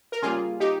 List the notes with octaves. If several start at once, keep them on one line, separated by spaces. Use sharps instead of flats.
A#4
C#3 G3 A#3 F4 G#4
D#4 G4